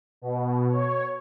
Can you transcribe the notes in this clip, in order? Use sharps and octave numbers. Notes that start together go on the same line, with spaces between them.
B2
C#5